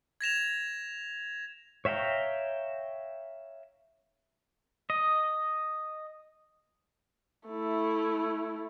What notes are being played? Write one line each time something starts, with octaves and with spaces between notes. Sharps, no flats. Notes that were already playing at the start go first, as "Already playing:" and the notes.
G#6 A#6 E7 F7
C#5 E5 F5 G5 A#5
D#5
A3 E4